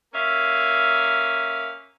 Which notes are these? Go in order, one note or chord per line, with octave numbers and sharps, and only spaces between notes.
A#3 C#4 E5 F5